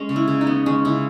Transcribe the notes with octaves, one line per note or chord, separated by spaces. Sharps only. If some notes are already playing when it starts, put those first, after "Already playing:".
Already playing: G#3 C#4
C#3
E4
C#3
D#4
B3
G#3 C#4
C#3 E4